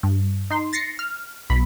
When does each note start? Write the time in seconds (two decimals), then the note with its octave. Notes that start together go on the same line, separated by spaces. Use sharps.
0.03 G2
0.50 D#4 C6
0.73 A6 A#6 C7 C#7
0.99 F6
1.50 B1 B2 B5